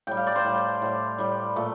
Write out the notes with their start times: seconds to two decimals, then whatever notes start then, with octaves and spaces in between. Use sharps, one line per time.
0.07 A2 G3 G5
0.17 F5
0.27 D5
0.36 C5
0.44 A2 G3
0.82 A2 G3
1.18 A2 G3
1.56 A#2 A3